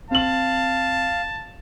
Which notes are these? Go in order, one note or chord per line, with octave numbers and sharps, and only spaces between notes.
C4 F5 A5 F#7